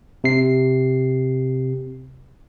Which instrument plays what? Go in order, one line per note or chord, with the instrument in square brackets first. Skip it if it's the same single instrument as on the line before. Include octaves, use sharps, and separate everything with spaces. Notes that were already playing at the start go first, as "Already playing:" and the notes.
[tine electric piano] C3 C7